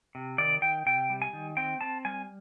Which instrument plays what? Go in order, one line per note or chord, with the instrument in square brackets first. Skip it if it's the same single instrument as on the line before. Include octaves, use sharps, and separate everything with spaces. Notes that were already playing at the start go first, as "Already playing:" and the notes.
[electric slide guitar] C3
D#3 D5
D#3 G5
C3 G5
G3
G#5
D#3
C4 G5
C4 A5
G3 G#5